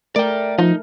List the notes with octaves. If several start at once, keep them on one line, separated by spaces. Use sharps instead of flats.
A3 A#4 D5 G5
F3 D#4